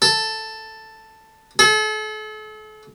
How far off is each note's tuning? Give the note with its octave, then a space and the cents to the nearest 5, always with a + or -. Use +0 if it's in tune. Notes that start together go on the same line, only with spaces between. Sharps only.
A4 +5
A4 -40